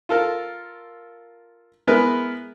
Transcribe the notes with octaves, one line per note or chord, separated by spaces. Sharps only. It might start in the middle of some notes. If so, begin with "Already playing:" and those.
F4 A4 A#4
G#3 B3 E4 A#4 B4